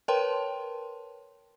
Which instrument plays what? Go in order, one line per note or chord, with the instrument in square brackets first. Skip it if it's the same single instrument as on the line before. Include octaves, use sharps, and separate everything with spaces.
[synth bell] A#4 B4 C#5 G5 A5 C6